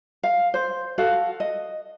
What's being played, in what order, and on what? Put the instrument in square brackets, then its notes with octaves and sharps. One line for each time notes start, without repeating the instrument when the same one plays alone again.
[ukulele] F5
C5
F#4 A4 F5
D#5